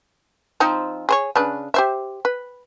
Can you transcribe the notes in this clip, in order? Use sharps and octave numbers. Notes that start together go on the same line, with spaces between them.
F3 C4 D#4
G#4 C5 C#5
C#3 D4 B4
G4 C5 E5
B4